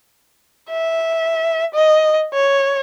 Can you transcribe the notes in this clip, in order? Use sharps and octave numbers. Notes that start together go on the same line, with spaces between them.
E5
D#5
C#5